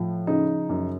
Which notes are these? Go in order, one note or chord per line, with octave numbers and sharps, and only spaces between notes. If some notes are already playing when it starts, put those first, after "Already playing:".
Already playing: A2 F3
C#3 D#4
F#2